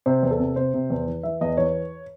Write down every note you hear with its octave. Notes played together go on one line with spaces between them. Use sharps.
C3 C5
E2
A4
C3
C3 C5
C3
E2
E3
E3 E5
E2 D#5
E3 C#5